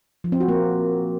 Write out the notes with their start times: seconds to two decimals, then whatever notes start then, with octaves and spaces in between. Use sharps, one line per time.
0.24 F3
0.32 C4
0.40 F#4
0.48 A#3